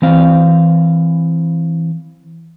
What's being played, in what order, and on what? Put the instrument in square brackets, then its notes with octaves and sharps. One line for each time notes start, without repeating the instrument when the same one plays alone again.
[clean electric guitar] E3 C4 F5